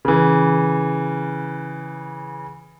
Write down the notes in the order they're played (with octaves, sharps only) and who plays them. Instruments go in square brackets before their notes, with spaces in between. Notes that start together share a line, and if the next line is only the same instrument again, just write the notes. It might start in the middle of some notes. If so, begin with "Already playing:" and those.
[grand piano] C#3 E3